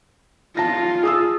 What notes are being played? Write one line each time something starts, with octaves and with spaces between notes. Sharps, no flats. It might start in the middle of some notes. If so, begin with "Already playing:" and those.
F4 A5 A#6
G#4 D#6 E6